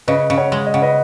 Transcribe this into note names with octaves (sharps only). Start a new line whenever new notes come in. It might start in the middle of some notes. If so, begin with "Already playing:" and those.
C#3 B4 D#5
C#3
C#5 F#5
G#3
D#5
C#3 F#5
B4 D#5